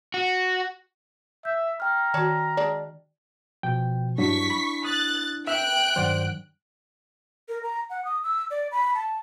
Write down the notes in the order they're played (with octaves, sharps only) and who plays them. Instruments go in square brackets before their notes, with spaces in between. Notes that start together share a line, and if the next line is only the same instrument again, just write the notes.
[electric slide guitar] F#4
[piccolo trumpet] E5 [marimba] G6
[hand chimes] G5 F6 [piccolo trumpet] A#5
[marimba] D#3 F#4 [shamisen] C#5 D5 A5
[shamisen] G#3 D4 D5
[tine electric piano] B2 F3 [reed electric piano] G5
[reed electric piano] G2 F#3 [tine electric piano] D4 E4 [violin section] C#6 B6
[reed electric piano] B5
[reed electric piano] D#6 [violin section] F#6 A6
[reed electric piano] E5 [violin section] G5 F#6 D7
[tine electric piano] G2 D#3 F#3 [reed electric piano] C5 D5 F#5
[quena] A#4
A#5
F#5
D#6
E6
D5
B5
A5